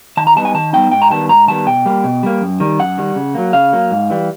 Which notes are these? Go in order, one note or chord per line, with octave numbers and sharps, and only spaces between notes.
D#3 A5
A#5
G3 B3 D#4 A5
G#5
D#3 A5
G3 B3 D#4 G5
G#2 G5
A#5
D#3 G3 B3 A5
G#2 A#5
D#3 G3 B3 A5
B2 G5
G3 A#3
B2
G3 A#3
F#2
D#3 G3
F#2 F#5
D#3 G3
C#3
F#3 A#3
C#3 F5
F#3 A#3
G#2
E3 G3